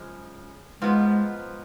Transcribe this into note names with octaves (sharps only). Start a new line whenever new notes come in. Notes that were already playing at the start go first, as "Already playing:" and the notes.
Already playing: F#2 C#3 F3 G#3
G#2 F3 G#3 B3